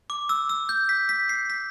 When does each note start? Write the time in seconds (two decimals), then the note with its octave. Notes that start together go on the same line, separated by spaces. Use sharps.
0.10 D6
0.29 E6
0.49 E6
0.69 G6
0.89 B6
1.09 B6
1.29 C7
1.50 B6